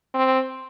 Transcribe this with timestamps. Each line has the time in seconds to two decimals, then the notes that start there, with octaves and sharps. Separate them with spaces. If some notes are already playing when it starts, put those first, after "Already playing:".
0.15 C4